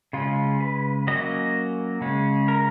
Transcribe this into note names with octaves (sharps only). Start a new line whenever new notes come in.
C#3 G#3 C#4 F4
B4
F#3 A#3 C#4 D#5
C#3 G#3 C#4
A#4